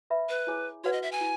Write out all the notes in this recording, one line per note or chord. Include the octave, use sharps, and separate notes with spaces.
B4 E5 B5
B4
E4 G#4 C#5 G#5
F#4 B4 C#5 F#5
D#5
E5
G#5
E4